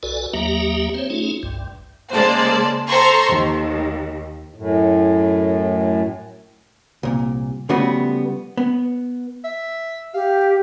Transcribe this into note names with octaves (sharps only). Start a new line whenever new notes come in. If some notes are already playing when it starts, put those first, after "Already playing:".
B1 F#4 A4 B4 D5 G#5
D#2 F#3 A#3 G4 E5 A#5
C4 C5 C#5
A3 C#4 D#4 F4 G#4
G1 C2 G2
C#3 G#3 A#3 C5 D5 A5
A4 C5 A#5 C6 C#6
D#2
F#2 A2
C2 A#2
C#3 F3 G3 A3 B3 F#4
B3
E5
G4 F5